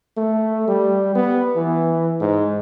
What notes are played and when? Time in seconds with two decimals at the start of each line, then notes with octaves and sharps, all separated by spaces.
0.17 A3
0.68 G3
1.15 B3
1.56 E3
2.21 G#2